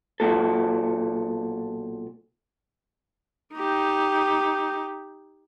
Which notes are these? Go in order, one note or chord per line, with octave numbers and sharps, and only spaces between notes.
B1 G2 A#2 A4
D#4 G4